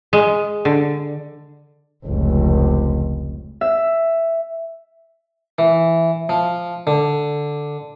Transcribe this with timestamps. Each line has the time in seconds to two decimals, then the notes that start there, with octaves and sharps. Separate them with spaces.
0.13 G#3
0.65 D3
2.06 F1 C#2
3.61 E5
5.59 E3
6.29 F3
6.87 D3